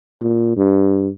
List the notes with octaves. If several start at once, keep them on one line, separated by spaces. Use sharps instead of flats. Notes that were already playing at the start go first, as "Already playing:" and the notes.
A#2
G2